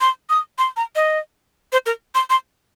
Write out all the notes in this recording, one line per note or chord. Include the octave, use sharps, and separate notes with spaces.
C6
D#6
C6
A#5
D#5
C5
A#4
C6
C6